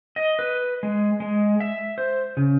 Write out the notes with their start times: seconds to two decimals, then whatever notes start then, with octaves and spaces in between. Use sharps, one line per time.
0.16 D#5
0.39 B4
0.83 G#3
1.20 G#3
1.60 E5
1.98 C5
2.37 C#3